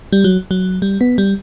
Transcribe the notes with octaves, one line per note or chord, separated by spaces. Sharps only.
G3
F#3
F#3
G3
B3
G3